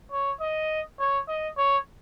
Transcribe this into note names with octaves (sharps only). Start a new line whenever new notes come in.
C#5
D#5
C#5
D#5
C#5